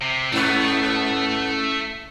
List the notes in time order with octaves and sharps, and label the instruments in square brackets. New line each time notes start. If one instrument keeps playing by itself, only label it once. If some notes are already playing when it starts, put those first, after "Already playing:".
[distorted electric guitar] C3
[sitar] G#2 B3 [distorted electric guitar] A3 [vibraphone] C#4 E4